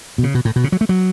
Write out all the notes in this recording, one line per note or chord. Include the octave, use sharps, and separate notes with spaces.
B2
C#3
B2
A2
B2
C#3
F#3
A3
F#3